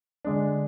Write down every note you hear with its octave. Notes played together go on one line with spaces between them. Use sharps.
D3 G#3 D4